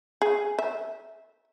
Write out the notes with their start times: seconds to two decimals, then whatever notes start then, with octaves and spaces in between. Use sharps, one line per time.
0.22 G#4
0.59 E5